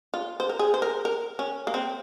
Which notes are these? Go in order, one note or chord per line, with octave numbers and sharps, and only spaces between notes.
F4
C5
A#4
G#4
C5
A#4
A#4
C#4
A#3
C4